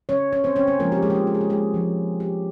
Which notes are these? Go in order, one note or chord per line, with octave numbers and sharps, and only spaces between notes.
C#4 C#5
C#4 C#5
C4 C5
C#4 C#5
C4 C5
C3 F3 G#3 A#3 C4 F4 A#4
G4
G#3 G#4
G4
F4
G4
G#4
G4
G#3 G#4
F3 G#3 C4 F4
G4